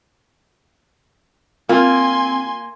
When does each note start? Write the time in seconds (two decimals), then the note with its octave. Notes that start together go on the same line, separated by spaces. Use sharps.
1.69 A#3 C4 F4 G#5 C6